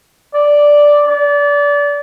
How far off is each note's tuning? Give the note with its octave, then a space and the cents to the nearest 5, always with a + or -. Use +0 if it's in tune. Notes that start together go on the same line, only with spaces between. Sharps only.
D5 +0
D5 -30